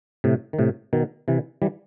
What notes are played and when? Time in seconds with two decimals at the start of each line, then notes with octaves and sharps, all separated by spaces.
0.24 A2 C3
0.53 D#3
0.59 A2 C3
0.93 B2 D#3
1.28 C3 E3
1.62 E3 G3